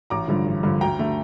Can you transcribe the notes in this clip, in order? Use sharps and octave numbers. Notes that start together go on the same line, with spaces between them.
A1 A#5 D6
G2 D3 F3
A1
G2 D3 F3
D2 G5 A#5
D3 A3